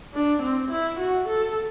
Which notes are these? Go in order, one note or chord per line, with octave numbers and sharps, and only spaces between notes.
D4
C4
E4
F#4
A4